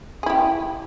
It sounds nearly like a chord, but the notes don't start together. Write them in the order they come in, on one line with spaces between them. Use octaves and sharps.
G#4 E4 G4